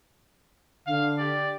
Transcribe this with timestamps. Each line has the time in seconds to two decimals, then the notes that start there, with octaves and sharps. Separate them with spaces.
0.87 D3 F5
1.17 G4 D5